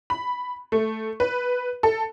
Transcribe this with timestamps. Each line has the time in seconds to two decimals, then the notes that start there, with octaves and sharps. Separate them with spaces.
0.10 B5
0.72 A3
1.20 B4
1.83 A4